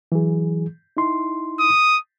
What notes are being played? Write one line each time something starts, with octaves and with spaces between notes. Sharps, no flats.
E3 F#3 G#4
D#4 E4 C6
D#6